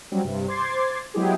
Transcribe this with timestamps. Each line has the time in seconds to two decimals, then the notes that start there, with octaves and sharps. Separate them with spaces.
0.12 F#3 G3 C4 C#4
0.24 G2 C3
0.48 C5 C6 D6 G#6 A6 C7
1.14 F#3 G#3 B3 E4 G4 G#4